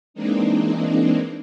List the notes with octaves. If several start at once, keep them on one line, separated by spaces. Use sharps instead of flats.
E3 G#3 A#3 C4 D4 D#4